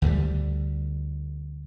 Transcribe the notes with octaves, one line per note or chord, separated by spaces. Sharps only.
D2 D3 D#3 G3